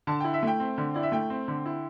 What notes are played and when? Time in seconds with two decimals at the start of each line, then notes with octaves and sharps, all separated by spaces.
0.07 D3 A5
0.20 E4 G5
0.34 E5
0.43 A3 G5
0.60 C4
0.78 D3
0.94 E4 D5
1.03 E5
1.12 A3 G5
1.30 C4
1.48 D3
1.66 E4